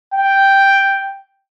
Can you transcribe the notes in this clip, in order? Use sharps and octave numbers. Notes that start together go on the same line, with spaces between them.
G5